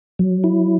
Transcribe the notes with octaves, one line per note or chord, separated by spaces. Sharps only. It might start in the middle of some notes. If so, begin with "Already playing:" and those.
F#3
E4